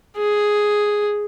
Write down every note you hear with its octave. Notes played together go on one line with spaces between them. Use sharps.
G#4